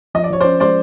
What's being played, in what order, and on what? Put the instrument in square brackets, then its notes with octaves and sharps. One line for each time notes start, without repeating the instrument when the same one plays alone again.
[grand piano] F3 [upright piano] D#5
[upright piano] D5
[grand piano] F3 [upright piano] C#5
[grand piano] C#4 [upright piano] C5 D5
[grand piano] G#3 [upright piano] C5 D5